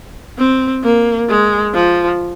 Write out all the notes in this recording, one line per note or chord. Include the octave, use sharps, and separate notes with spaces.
C4
A#3
G#3
F3